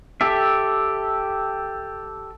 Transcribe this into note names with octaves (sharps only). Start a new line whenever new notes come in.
G4 A4 E5